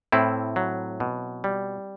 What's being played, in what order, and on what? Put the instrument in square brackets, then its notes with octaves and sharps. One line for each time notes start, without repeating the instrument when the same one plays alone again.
[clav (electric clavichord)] A2 C4 E4
F#3
B2
G3